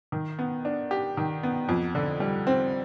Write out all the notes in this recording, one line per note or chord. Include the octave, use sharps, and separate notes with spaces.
D#3
B3
D4
G4
D#3
B3
F2
D3
G3
C4